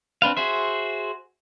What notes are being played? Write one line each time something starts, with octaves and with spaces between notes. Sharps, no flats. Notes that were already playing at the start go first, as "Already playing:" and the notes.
C4 D4 B4 F5
F#4 G#4 C5 E5